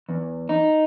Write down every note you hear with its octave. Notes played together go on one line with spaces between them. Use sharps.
E2
D#4